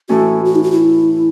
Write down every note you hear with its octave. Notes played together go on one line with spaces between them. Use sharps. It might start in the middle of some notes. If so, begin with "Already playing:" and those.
A2 E3 A3 C#4 F#4
F#4
D#4
F#4
E4